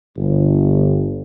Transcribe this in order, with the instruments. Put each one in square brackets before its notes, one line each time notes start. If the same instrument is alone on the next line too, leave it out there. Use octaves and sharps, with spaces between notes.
[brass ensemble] G1